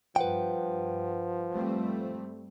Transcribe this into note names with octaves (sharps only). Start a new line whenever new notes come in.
G2 F3 B4 F#5 G5
G3 A3 C4